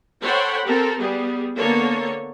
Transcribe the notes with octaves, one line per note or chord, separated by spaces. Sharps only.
A4 C5 C#5 F#5 G5 B5
C4 G4 A4 A#4
G3 B3 G4 G#4
D3 A#3 B3 A4 C#5